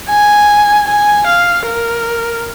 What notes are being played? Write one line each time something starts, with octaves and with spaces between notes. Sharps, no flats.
G#5
G#5
F5
A#4